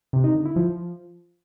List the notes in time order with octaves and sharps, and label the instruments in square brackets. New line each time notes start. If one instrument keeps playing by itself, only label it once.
[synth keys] C3
D#4
D3
E4
F3